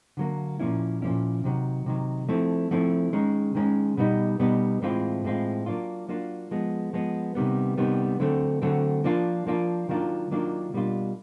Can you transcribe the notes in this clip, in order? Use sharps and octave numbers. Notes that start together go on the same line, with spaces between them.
D3 F#3 A#3
A#2 F3 A#3 C#4 E4
A#2 F3 A#3 C#4 E4
C3 D#3 F#3
C3 D#3 F#3
F3 A3 C4 E4
F3 A3 C4 E4
D#3 G#3 C#4
D#3 G#3 C#4
B2 G3 B3 D#4
B2 G3 B3 D#4
A2 E3 G#3 C4 F4
A2 E3 G#3 C4 F4
F#3 A#3 D4 F4
F#3 A#3 D4 F4
F3 G#3 B3
F3 G#3 B3
C3 D#3 G3 B3
C3 D#3 G3 B3
D3 F#3 A3 C4
D3 F#3 A3 C4
F3 A#3 D4 F4
F3 A#3 D4 F4
D#3 F#3 A#3 D4 F4
D#3 F#3 A#3 D4 F4
B2 G3 A#3 D4 F4